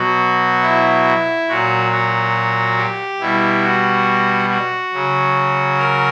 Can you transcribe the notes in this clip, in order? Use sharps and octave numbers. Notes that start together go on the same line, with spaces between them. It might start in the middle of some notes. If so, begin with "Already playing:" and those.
Already playing: B2 F#3 F#4
E4
A#2 F#3 F#4
F#4
G4
B2 G3 E4
F#4
F#4
C#3 F#3
A#4